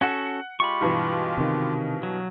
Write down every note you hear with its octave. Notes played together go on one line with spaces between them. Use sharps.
C#4 F#4 A4 F#5
G#3 F4 G4 B5 C#6
G2 B2 E3
C3 D#3
F#3